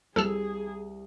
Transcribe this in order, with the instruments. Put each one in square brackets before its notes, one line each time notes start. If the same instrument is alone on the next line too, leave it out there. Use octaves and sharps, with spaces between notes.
[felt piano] C2 [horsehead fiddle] G#4 [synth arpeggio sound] A4 E6